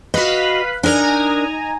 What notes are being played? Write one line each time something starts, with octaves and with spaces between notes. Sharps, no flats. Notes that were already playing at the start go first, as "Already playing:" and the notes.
F#4 B4 D#5 F5 B5
D4 D#4 A#4 G#5 A#5